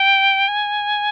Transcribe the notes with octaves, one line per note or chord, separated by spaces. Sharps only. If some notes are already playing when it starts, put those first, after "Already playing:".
Already playing: G5
G#5